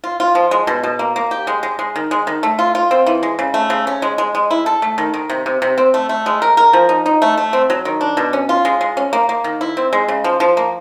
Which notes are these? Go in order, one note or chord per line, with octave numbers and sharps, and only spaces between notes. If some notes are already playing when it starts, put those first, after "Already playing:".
F4
F4
F3
G#3
B2
B2
A#3
A#3
G4
G#3
G#3
G#3
D#3
G#3
D#3
A3
F4
F4
C4
E3
G#3
C#3
A3
C#3
C#4
G#3
G#3
G#3
E4
A4
A3
D#3
D#3
C3
C3
C3
C4
A3
A3
G#3
A#4
A#4
F3
D#4
D#4
A3
A3
C4
F#3
D#3
D4
B2
C#4
F4
G#3
G#3
C#4
A#3
A#3
D#3
E4
C4
G#3
C#3
F3
F3
A#3